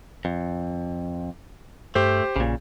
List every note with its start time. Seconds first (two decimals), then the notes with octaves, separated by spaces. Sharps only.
0.25 F2
1.95 G2 A3 G4 C5
2.36 A#1 A#2 C#3